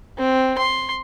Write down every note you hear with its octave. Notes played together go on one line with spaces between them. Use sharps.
C4
C6